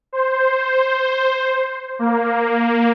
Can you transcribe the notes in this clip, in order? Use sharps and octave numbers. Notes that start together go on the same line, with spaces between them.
C5
A#3